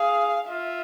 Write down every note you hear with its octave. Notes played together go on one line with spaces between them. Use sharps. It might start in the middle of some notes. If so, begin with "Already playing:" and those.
Already playing: G#4 F5
F4 E5